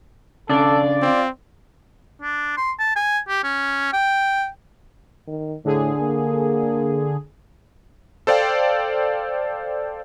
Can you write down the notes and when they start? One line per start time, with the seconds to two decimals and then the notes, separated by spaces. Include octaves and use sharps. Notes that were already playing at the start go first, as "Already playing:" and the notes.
0.49 C#3 D4 A4 D5
1.02 C4 F4
2.22 D4
2.57 C6
2.79 A5
2.96 G#5
3.28 G4
3.43 C#4
3.93 G5
5.28 D#3
5.64 A2 D3 G#4
6.00 A#3
8.27 A4 C5 D5 F5 G5